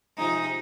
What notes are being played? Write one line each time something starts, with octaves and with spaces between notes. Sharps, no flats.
C3 F3 G#3 D#4